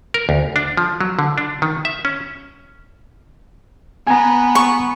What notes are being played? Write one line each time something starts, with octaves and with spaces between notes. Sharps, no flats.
A#4
D2
D4
F3
F#3
D3
D4
D#3
E5
C#4
B3 B4 G#5 A#5
C#6